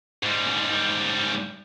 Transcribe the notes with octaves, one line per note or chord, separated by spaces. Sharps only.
G#2 G3